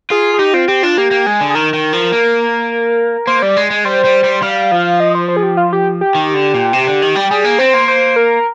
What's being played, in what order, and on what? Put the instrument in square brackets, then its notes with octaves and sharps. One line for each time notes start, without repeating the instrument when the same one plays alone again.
[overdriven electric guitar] F4 [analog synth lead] G#4
[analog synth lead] G#4
[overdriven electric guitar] D#4 [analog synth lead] G4
[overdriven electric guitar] C4 [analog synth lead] F4
[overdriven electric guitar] C4 [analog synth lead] G4
[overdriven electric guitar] D4 [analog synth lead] F4
[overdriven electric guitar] A#3 [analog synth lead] G4
[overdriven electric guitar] A#3
[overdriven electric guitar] G#3 [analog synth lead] G#4
[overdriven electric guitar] D3
[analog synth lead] G#4
[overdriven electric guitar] D#3 [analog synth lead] A#4
[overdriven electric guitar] D#3
F3
A#3
[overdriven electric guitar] A#3 [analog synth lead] C5
[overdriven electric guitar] G3 [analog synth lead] D5
[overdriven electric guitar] G#3
G#3
[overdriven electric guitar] G3 [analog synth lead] C5
[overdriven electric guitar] G3
G3
[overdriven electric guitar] G3 [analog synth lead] F5
[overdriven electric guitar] F3
[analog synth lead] D#5
C5
C5
G#4
G4
F4
G4
G4
[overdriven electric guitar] D#3
D3
A#2
C3
D3
D#3
G3
[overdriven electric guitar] G3 [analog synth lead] G#4
[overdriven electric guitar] A#3
[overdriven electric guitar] C4 [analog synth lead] C5
[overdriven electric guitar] A#3
[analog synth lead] C5
A#4